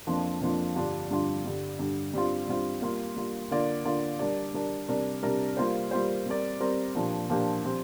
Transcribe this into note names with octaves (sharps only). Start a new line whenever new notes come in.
F2 F3 A#3 D4 F4
F2 F3 A#3 D4 F4
G2 D3 G3 D4 F4
G2 D3 G3 D4 F4
G2 D3 G3
G2 D3 G3
G2 G3 C4 F4
G2 G3 C4 F4
G3 A#3 F4
G3 A#3 F4
D3 A#3 F4 D5
D3 A#3 F4 D5
G3 D4 A#4 D5
G3 D4 A#4 D5
C3 G3 D4 A#4 D5
C3 G3 D4 A#4 D5
G3 A#3 F4 C5
G3 A#3 F4 C5
G3 C4 A#4 D5
G3 C4 A#4 D5
A#2 F3 A#3 D4 G4
A#2 F3 A#3 D4 G4
F3 C4 G4